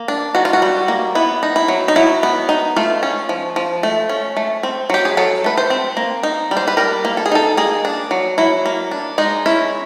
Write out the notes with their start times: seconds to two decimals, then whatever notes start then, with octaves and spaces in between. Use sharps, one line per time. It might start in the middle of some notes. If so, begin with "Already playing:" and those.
Already playing: A#3
0.08 D4
0.35 D#3 F#4
0.45 F4
0.53 F#4
0.62 G3
0.88 A#3
1.15 B3 E4
1.43 D#4
1.56 E4
1.68 F#3
1.88 D#4
1.96 F#3 E4
2.23 B3
2.49 D#4
2.76 A3 F4
3.03 C#4
3.29 F3
3.56 F3
3.83 A3
4.09 C#4
4.37 A3
4.63 C4
4.90 F#3 G4
5.05 G#4
5.17 F#3 A4
5.44 A3 B4
5.57 C5
5.70 C4
5.97 A#3
6.23 D#4
6.51 G3
6.57 C5
6.68 B4
6.77 G3 A#4
7.05 A#3
7.17 A4
7.26 G#4
7.32 D#4 A4
7.57 A#3 G#4
7.85 D4
8.11 F#3
8.38 F#3 E4
8.66 A#3
8.91 D4
9.18 G#3 D#4
9.46 C#4 E4